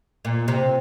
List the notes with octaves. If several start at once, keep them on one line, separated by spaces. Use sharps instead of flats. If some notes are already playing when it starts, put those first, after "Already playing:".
A#2
C3